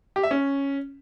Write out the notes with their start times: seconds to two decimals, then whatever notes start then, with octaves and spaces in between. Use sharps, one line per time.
0.16 G4
0.23 E5
0.31 C#4